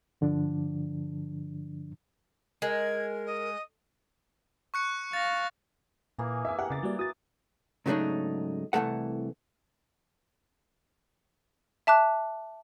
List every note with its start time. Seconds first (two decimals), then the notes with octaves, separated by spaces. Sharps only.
0.21 G2 D3 F3 D4
2.62 G#3 A#4 G#6
3.26 D#5
4.74 C#6 F#6 C#7
5.13 F5 A6 A#6
6.19 A#2 E3 A#3 G#4
6.45 E5 G#5
6.59 G4 A#4 F#5
6.70 C#3 D6 A6
6.83 G3 A#3 F#4 D5
6.99 F#4 D#6 A6
7.86 G#2 C#3 F#3 A3 D4 D#4
8.73 C2 E3 F3 A3 A4 F#5
11.87 E5 A5 D6 F#6